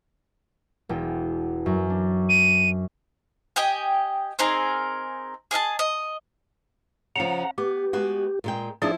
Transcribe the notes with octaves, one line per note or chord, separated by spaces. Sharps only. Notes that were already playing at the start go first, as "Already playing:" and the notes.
E1 E2 G5
F#2
D4
D#7
G4 D#5 G5 G#5
C4 D#4 G#4 A#4
G#4 D#5 F5 A5
D#5
C#3 F3 F#5 A#5
B3 G4
G#3 B3 F#4
A#2 G#3 G5
F3 D4 E4 G#4 D5